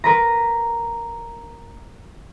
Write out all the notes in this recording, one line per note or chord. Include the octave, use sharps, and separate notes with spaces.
A#4 B4 A#5